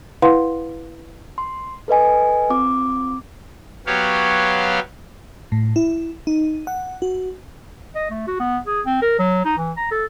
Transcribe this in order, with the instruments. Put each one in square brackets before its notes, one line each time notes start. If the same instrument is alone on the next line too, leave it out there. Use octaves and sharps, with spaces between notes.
[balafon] E4 B4 F5 F#5 C6
[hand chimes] C6
A4 B4 D#5 G#5
C4 F4 D6
[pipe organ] F#3 B3 G4 C#5 F5
[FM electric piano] A2
E4
D#4
F#5
F#4
[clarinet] D#5
A3
F#4
B3
G#4
C4
A#4
F#3
D#4
E3
A#5
A4